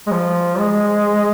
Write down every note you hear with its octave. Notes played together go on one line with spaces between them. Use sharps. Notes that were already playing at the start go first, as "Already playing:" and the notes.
G#3
F3
G#3